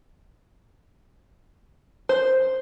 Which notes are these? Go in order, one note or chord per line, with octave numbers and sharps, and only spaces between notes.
C5